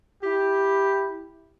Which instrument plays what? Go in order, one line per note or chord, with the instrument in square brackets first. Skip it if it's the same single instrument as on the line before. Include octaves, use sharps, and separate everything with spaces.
[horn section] E4 G4